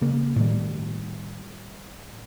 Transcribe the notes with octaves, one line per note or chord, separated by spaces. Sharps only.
C#3 A#3
A2 D#3 G3